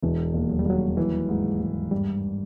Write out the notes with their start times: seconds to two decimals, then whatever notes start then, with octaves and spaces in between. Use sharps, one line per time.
0.03 E1 E3
0.34 D#2
0.49 F#3
0.59 G3
0.66 D#2 F#3
0.97 E3
1.29 G#2
1.60 G#2
1.91 G2 G3